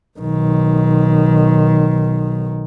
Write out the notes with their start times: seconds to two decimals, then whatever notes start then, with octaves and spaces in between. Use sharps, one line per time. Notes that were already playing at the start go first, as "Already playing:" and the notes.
0.20 B1 D#3